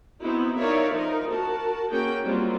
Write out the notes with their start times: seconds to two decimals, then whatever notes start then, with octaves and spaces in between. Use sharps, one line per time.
0.21 B3 C4 D#4 E4 F#4
0.58 D#4 A#4 C#5 D5 E5 F5
0.92 F3 D#4 A#4
1.30 F#4 A#4 A5
1.92 A#3 C#4 F#4 G#4 G5
2.24 F#3 G3 A#3 C4 F4